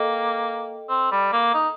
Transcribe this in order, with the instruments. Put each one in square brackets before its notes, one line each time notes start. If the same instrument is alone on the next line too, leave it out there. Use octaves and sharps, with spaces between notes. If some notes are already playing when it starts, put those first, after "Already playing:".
Already playing: [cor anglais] A#3 [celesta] A4 D#5 G5
[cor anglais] C4
G3
A#3
D#4